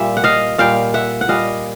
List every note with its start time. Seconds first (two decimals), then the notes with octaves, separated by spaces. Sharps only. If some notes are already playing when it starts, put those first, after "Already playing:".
Already playing: A#2 G3 E5
0.17 F#5
0.24 D#5 F5
0.58 A#2 G3 F5 G5
0.94 E5 F#5
1.21 F#5
1.28 A#2 G3 D#5 F5